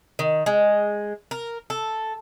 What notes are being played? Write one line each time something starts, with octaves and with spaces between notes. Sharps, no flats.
D#3
G#3
A#4
A4